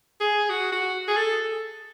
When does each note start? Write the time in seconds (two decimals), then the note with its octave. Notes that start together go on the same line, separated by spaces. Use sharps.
0.20 G#4
0.50 F#4
0.72 F#4
1.08 G#4
1.17 A4